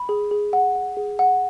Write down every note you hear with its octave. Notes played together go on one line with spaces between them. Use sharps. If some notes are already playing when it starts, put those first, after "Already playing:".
Already playing: B5
G#4
G#4
F#5
F#5
G#4
F#5